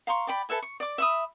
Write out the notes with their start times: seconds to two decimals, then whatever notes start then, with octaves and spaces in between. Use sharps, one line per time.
0.07 F5 A#5 C6 C#6
0.27 D5 G5 B5
0.49 A4 B4 E5 G#5
0.62 C#6
0.80 D5 D6
0.98 E5 B5 D#6